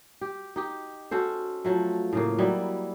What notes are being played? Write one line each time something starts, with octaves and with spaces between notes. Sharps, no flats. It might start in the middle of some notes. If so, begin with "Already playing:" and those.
G4
D#4 G4 D#5
C#4 F#4 A4 C5
F3 F#3 A3
A2 C#3 A#3
F#3 G3 E4 D#5